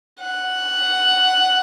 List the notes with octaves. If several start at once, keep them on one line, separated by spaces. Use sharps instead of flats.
F#5